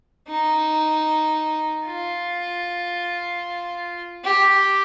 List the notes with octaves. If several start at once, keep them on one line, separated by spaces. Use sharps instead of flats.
D#4
F4
G4